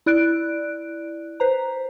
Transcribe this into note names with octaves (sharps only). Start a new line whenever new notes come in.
E4 D5 F#6 D7
B4 C5 A#5